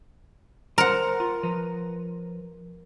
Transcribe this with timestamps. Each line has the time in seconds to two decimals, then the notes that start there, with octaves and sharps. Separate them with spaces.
0.78 A#4 C5 F#5
1.20 F4
1.43 F3 B4 A#5